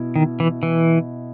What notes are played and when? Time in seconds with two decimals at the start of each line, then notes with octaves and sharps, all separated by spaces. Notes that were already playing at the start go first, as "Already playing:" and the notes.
Already playing: B2 E4
0.16 D#3
0.40 E3
0.63 E3